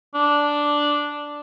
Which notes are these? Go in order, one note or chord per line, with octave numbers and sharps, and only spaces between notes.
D4